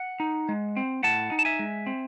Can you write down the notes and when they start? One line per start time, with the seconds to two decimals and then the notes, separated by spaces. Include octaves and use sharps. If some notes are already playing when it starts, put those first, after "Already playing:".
Already playing: F#5
0.20 D#4
0.49 G#3
0.77 C4
1.03 A2 F#5 A5
1.32 D#4
1.39 A5
1.45 E5 G#5
1.59 G#3
1.87 C4